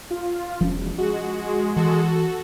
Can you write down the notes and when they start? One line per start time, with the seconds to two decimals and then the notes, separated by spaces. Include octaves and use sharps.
0.11 F4
0.61 E1 F3 C#4
0.98 G#3 F#4
1.76 E3 F#4 A4